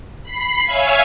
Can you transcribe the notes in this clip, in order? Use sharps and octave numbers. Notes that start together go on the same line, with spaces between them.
B5 C7
C#5 E5 F5 G#5